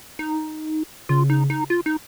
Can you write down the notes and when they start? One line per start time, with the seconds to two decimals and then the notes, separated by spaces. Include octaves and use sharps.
0.19 D#4
1.09 C#3 F4
1.30 D#4
1.50 D#4
1.70 F4
1.86 D#4